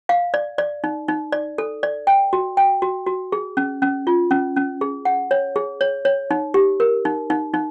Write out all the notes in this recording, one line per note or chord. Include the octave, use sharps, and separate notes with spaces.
F5
D5
D5
D#4
D#4
D5
A4
D5
G5
F#4
G5
F#4
F#4
G#4
C#4
C#4
F4
C#4
C#4
G#4
F#5
C#5
G#4
C#5
C#5
D#4
G4
A#4
D#4
D#4
D#4